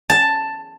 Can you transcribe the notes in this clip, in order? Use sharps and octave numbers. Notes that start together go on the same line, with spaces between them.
A5